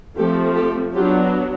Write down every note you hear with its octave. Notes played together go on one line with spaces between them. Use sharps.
F3 A3 C4 G4 A4
G4 A4
F#3 B3 D4 F4 G4